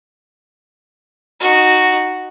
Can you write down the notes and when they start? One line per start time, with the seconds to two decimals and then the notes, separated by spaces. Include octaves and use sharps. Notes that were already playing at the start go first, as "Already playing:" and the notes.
1.40 D#4 F#4